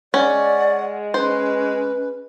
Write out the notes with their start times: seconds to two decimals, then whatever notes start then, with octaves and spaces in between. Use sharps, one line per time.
0.14 G#3 C#4 D5 F#5
1.14 C#4 B4 C5